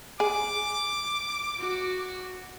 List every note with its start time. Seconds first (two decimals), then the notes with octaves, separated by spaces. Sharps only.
0.20 G#4 D6
1.58 F#4